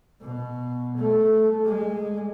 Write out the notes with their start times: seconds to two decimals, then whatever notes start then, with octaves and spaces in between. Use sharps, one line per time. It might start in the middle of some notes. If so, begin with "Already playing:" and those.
0.21 B2
0.97 A3
1.65 G#3